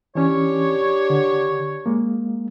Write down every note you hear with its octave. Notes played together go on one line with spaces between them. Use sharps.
E3 C#4 D4 G4 C#5
D3
G#3 A#3